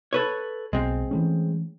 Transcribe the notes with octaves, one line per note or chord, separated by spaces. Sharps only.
A4 B4 C#5
B1 G#3 C4
E3 A3 C#4